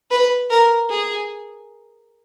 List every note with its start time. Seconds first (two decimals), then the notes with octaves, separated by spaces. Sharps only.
0.11 B4
0.50 A#4
0.90 G#4